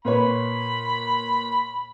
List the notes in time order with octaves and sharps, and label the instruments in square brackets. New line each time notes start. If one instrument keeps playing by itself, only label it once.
[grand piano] A#2 B4 C#5 [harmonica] B5